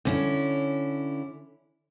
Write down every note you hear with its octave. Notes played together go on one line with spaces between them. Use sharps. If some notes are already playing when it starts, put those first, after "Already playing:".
D3 C#4 E4